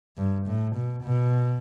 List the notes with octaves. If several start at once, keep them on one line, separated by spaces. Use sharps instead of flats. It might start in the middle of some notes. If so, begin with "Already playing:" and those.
G2
A2
B2
B2